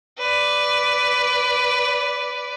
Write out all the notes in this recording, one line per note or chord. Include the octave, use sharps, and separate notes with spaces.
B4 D5